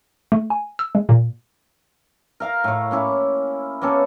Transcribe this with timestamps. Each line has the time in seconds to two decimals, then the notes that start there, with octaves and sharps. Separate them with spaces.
0.32 A3
0.50 G#5
0.79 E6
0.95 G#3
1.09 A#2
2.40 A#4 F5 A#5
2.64 A2 C#6
2.91 A#3 C#4 E4
3.82 A#3 B3 C#4 A4